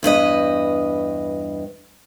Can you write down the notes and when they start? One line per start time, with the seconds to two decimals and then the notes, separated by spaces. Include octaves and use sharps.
0.03 E2 G2 B4 D#5